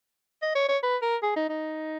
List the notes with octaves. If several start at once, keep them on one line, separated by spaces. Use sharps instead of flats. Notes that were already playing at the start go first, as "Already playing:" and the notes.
D#5
C#5
C#5
B4
A#4
G#4
D#4
D#4